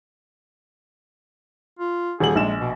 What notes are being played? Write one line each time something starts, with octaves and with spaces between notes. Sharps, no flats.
F4
D#1 G#4 F#7
A#1 G#3 E7
B2